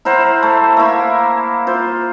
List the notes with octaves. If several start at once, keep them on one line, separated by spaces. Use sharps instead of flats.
E4 A#4 C5 F#5
A3
A#3 E4
F4 C5